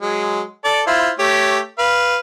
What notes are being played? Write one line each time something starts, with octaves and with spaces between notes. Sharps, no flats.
F#3 G#3
A4 D5
E4 F4 C5
A3 G4 C#5
B4 F5